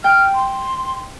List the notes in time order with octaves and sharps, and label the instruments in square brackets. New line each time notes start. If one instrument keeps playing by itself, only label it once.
[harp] G5 [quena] F6
[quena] C6